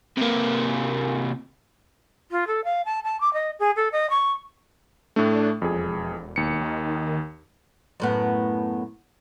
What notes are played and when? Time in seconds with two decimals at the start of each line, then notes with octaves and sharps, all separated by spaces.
0.17 C3 A#3
2.31 F4
2.47 A4
2.64 F5
2.86 A5
3.04 A5
3.21 D6
3.34 D#5
3.59 G#4
3.76 A4
3.92 D#5
4.10 C#6
5.16 A2 A3 D4
5.62 E1 F2 G#4
6.36 D#2 C#7
6.61 D#3
8.00 F#2 A2 B3